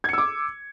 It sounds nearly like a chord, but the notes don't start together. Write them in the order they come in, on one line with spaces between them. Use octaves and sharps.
G#6 C#7 E6 D6